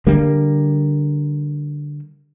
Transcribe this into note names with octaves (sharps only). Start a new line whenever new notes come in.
D3 G3 A#3